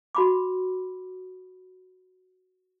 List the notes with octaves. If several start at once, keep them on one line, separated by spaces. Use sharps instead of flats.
F#4 B5 D6